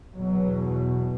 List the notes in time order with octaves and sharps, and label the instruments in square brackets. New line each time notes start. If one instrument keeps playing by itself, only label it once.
[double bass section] E2 B2 F#3